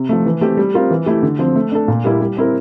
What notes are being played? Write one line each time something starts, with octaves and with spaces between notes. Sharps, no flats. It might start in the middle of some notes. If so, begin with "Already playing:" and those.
Already playing: C3
F3 A3
E3
A3 C4 G4
G3
C4 F4 A#4
E3
A3 E4 G4
D3
F3 C4
A3
D4 A4
A#2
G3 A#3 E4
G3
C4 E4 A#4